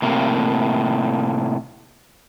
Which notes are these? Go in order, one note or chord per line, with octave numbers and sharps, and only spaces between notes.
A2 C3 A#3